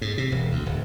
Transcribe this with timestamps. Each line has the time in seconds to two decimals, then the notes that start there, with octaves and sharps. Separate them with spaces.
0.01 G#2
0.18 C3
0.32 E1
0.52 D2
0.66 D1